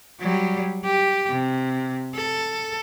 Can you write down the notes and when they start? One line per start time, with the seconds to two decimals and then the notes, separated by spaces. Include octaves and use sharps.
0.20 F#3 G3
0.83 G4
1.29 C3
2.15 A4